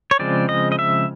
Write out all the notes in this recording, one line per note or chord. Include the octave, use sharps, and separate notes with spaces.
C#5
C#3 F3 G#3 C4 D5
D#5
D#5
E5